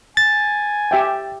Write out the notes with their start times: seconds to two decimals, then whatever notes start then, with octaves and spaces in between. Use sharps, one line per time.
0.17 G#5 A6
0.91 G4 E5 G5